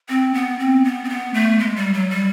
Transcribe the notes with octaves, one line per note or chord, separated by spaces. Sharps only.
C4
B3
C4
B3
C4
B3
A3
G#3
G3
F#3
G3